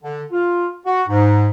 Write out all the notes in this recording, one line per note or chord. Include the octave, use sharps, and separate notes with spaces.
D3
F4
F#4
G#2